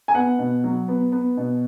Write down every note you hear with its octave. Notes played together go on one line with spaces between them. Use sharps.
G#5
B3 F#5
B2
F#3
B3
B3
B2